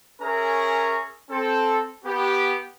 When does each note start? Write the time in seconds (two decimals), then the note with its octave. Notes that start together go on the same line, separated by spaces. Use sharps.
0.21 C#4 G#4 A#4 C#5 E5 A#5
1.30 C4 A4
2.05 B3 G4